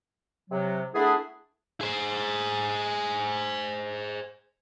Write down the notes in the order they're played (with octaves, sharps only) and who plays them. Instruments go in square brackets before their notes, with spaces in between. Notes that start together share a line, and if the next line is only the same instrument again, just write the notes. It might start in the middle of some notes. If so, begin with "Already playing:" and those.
[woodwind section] C3 F#3
A3 B3 D4 E4 G#4
[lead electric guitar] G#4 C5